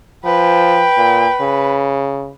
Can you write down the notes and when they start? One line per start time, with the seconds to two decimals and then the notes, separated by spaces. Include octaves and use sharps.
0.25 F3 B4 G5
0.97 A#2
1.41 C#3